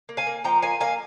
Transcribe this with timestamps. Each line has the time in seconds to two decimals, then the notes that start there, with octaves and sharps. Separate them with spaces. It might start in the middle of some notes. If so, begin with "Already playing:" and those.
0.09 A#3
0.17 F5 G#5
0.27 A#3
0.44 F3 G5 A#5
0.62 A#3 F5 G#5
0.81 A#3 F5 G#5